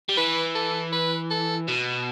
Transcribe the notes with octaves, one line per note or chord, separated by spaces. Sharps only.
G3
E3 B4
A4
B4
A4
B2